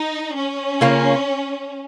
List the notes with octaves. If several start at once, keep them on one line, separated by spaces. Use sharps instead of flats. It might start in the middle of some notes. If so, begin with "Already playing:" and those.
Already playing: D#4
C#4
C#3 A#3 F4